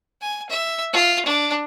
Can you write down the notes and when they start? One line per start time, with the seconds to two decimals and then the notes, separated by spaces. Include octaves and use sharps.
0.22 G#5
0.50 E5
0.93 F4
1.26 D4